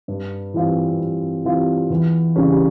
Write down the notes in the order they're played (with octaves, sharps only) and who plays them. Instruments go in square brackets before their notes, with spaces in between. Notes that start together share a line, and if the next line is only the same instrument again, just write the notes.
[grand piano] G2
E3 G3 C4 F4
G2
E3 G3 C4 F4
E2
C#3 E3 G3 C#4